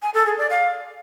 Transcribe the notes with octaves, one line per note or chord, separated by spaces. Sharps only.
G#5
A4
G#4
D5
F5